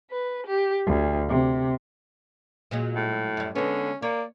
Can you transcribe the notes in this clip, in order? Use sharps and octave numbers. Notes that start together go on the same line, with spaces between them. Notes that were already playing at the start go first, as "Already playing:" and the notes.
B4
G4
D2
C3
A#2 F#3 G#3
A2
F#2 G3
D3 G#3 B3 C#4
A#3 C#5 D5